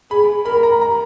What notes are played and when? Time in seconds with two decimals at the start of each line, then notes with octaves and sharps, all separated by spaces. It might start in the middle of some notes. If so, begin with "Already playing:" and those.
0.10 G#4 B5
0.45 A#4 B5
0.63 A#5
0.81 A#5